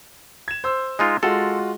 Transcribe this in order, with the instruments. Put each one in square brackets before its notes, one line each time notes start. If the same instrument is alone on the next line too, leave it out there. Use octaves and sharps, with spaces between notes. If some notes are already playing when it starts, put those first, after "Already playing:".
[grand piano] G#6 E7
C5 E6
[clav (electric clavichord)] G#3 D#4 F4
[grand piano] G#3 F4 F#4 [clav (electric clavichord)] A4